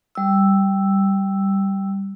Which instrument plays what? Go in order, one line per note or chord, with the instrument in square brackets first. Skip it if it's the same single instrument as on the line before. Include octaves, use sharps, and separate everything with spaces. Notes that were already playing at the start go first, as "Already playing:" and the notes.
[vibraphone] G3 E6